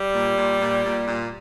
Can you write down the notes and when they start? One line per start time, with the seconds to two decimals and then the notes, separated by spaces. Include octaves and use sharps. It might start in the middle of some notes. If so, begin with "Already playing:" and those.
Already playing: G3
0.14 A#2
0.38 A#2
0.61 A#2
0.85 A#2
1.08 A#2